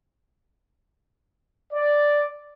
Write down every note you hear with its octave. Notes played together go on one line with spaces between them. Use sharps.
D5